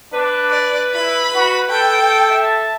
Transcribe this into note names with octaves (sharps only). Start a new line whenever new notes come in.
D4 B4
D5
E4 B5
F#4
A4 G5
E5 A5